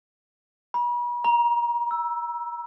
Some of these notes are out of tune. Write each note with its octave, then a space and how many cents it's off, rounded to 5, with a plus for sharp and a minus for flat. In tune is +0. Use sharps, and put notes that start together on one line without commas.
B5 -40
A#5 +30
E6 +5